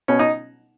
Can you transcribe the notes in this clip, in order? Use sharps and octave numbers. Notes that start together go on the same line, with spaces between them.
B2 C#4
D#4